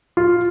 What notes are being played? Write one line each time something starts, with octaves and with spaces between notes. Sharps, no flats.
F4